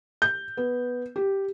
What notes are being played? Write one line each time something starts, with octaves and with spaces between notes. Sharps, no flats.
G6
B3
G4